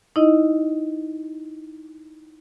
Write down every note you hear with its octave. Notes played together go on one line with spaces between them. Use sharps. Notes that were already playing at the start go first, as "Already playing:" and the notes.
D#4 E4 D#5